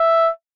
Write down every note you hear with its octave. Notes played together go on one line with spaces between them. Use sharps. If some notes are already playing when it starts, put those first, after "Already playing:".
Already playing: E5